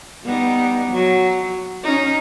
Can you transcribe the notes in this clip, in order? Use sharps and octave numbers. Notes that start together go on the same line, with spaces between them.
G3 B3 D#4
F#3
C#4 D#4